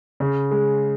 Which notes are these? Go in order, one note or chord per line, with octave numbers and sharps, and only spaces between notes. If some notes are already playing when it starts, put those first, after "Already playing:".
C#3
G#3